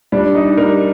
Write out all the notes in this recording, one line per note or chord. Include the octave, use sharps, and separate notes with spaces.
G3 D4
D#4
G3 A#4